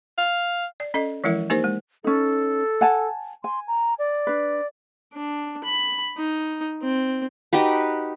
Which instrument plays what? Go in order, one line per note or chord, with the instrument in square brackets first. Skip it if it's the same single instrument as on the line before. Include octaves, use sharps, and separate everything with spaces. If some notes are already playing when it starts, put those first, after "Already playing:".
[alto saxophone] F5
[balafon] D5
C#4 A4 D#5
E3 F3 G#3 E4 A#4 E5
A#3 D#4 G4 A#4 C5
G#3
[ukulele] C#4 D#4 [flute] A4
[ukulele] F#5 G#5 A5
[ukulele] G#5 [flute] C6
[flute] A#5
D5
[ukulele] D4 B4
[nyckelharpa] D4
B5
D#4
C4
[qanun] D#4 F#4 G4 B4